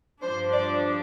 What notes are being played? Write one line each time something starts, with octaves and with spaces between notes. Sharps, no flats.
G2 F3 D4 C5
D5